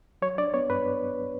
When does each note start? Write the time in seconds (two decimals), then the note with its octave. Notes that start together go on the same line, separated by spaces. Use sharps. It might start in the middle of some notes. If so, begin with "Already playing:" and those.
0.22 F#3 C#5
0.38 D4 D5
0.54 B3 C#5
0.70 G2 B4